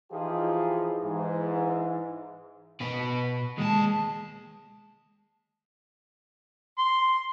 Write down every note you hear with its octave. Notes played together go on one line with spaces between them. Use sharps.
E3 F3 D#4 F4 G4 G#4
G#2 E3
B2 B4
D#2 G#3 A5
C6